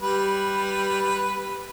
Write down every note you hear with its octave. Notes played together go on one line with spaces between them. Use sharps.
G3 B4